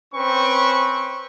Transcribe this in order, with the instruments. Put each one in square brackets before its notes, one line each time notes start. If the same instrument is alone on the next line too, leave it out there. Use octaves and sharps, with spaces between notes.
[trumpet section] C4 C#4 B4 C#6